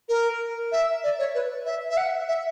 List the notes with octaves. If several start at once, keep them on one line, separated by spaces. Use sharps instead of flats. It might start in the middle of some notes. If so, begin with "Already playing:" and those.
A#4
E5
D5
C#5
B4
E5
E5
F#5
E5